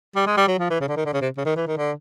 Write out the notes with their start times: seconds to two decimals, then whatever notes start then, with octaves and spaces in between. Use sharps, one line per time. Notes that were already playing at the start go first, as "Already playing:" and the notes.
0.16 G3
0.26 G#3
0.37 G3
0.48 F#3
0.59 F3
0.70 E3
0.81 C#3
0.88 D3
0.96 D#3
1.05 D3
1.13 C#3
1.21 C3
1.37 C#3
1.45 D#3
1.56 E3
1.67 D#3
1.77 D3